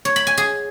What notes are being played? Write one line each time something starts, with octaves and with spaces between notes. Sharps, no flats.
C#5
B5
G#5
G#4